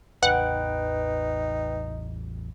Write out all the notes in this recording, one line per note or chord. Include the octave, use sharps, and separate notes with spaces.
A1 E2 D#4 B4 F#5 G5